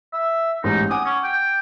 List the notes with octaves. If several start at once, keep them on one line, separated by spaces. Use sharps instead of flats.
E5
A1 G#2 D#4 G4
F#5 G#5 D6 D#6
C#4
G5